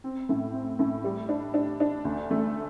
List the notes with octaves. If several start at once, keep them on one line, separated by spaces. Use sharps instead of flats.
C4
A2
C4
A2
G3
D4
D4
D4
D2
A3